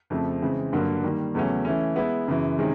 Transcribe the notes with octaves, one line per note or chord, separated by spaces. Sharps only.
F2 C#3 F3 A3
C#3 E3 G#3 C4
G2 D3 F#3 A#3
D#3 G3 A#3
E2 C#3 F#3 A3 C#4
E3 A3 C#4
G#3 B3 E4
F#2 C#3 E3
C3 D#3 G#3 C#4